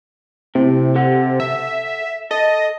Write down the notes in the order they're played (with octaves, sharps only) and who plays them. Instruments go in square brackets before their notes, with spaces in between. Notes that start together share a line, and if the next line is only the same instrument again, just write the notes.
[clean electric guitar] A2 [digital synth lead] C3
[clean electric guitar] A4 F#5
[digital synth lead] E5
[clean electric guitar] A4 [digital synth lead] D#5